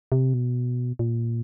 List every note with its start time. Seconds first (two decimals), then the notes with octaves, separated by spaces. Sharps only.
0.12 C3
0.34 B2
0.99 A#2